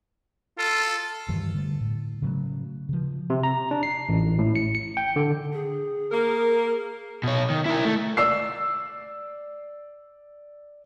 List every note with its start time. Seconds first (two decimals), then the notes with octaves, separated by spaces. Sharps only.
0.58 F4 A4
1.29 G2 D#3 E3 G3
1.54 D3 G3 A3
1.81 A2
2.22 C#3 F#3 A3
2.89 C#3 F3
3.30 C3
3.43 A#5
3.71 D4
3.83 C7
4.09 A1
4.39 A2
4.55 C#7
4.75 C#7
4.97 G5
5.16 D3
5.53 G#4
6.11 A#3 A#4
7.23 B2 C#5
7.50 D#3
7.66 E4 A#4
7.85 A3
8.17 D5 E6 C7